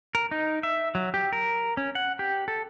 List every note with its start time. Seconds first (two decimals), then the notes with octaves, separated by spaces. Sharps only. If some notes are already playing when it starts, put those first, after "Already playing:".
0.15 A#4
0.31 D#4
0.63 E5
0.95 F#3
1.14 G4
1.33 A#4
1.77 C#4
1.95 F#5
2.19 G4
2.48 A4